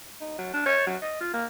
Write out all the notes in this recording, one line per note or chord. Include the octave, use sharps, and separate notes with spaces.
D#4
F#3
D4
C#5
F#3
D#5
F4
A#3